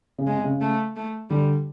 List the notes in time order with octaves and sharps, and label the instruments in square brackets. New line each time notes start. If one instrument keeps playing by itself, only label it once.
[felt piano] C#3
[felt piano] C3 [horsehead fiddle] G#3
[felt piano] C3
C#3
[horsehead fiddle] A3
A3
[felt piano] D3 [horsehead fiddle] G3